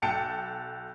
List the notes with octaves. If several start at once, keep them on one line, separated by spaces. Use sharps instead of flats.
B1 G5 A5 C#7